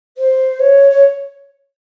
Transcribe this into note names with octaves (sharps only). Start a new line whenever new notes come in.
C5
C#5
C#5